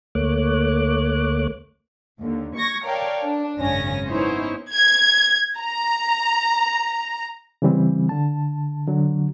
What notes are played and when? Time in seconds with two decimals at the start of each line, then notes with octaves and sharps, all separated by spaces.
0.15 D2 A3 A#3 C#5 D6 F#6
2.19 D#2 D3
2.55 C#6 G#6 A#6
2.86 A4 A#4 C#5 D5 F5 G5
3.23 D4
3.58 G#1 F#2 C#3 C#4 A#6
4.08 B3 C#4 D#4 E4 C5 C#5
4.73 G#6
5.59 A#5
7.62 C#3 E3 G3 C4
8.09 D3 A5
8.87 D3 F#3